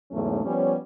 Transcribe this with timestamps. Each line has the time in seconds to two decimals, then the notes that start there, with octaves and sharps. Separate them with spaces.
0.11 E2 G#2 C#3 F#3 A3 C#4
0.44 F3 G3 B3 C#4